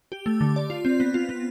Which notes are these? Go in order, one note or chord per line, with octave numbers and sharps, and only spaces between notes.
G4
A3
D3
D5
F4
C4
B3
F4
B3